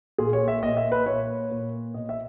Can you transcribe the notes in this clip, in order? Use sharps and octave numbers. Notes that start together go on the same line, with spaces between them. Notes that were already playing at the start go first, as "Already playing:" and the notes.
A#2 G#4
C#5
E5
A#2 D#5
E5
B4
A#2 C#5
A#2
B2 D#5
E5